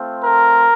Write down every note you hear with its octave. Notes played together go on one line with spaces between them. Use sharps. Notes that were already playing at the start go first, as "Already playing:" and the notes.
Already playing: A3 C4 F4
A#4